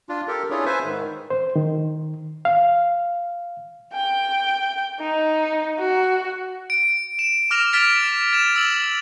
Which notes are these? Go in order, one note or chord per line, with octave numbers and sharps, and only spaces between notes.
D4 F4
G4 A4 A#4
C#4 D4 E4 F4 G#4 C#5
B4 C5 E5 G#5
G#2 D#3
C5
D#3
F5
G5
D#4
F#4
D7
E7
D6 F6 A#6 F7
F6 A6 B6 D7 F7
A6 E7
E6 F#7